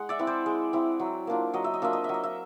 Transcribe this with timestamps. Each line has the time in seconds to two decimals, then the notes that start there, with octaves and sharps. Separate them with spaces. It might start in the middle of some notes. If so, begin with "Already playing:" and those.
Already playing: G#3 F#5
0.09 D5 E5
0.19 C4 E4
0.27 C5 D5
0.46 G#3
0.73 C4 E4
0.99 F#3
1.27 A#3 D4 F4
1.54 F#3 D#5
1.64 E5
1.74 D#5
1.82 A#3 D4 F4 E5
1.93 D#5
2.04 F#3 E5
2.14 D#5
2.23 E5